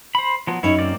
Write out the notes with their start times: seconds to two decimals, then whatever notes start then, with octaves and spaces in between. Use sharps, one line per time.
0.15 C5 B5
0.47 F3 F#3 B3
0.63 F#2 C#4 D#4 E4 C#5
0.79 A#3 C4 D5